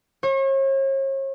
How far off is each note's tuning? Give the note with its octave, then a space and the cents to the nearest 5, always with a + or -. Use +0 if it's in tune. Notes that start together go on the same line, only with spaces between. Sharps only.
C#5 -40